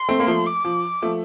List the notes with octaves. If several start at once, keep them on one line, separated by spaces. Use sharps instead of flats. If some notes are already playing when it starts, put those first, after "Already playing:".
Already playing: C6
A3 C4
A#3
F3 A3
D6
F3
F3 A3